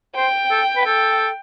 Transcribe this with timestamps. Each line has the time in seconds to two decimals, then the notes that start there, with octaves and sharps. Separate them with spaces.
0.16 C5 G5
0.51 A4
0.77 B4
0.85 A4 G5